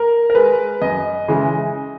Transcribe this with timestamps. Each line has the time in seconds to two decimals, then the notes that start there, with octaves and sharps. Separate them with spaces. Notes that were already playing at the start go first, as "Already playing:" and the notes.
Already playing: A#4
0.30 A#4
0.35 G#3 B4
0.82 F#2 D#5
1.28 C#3 E3 G#3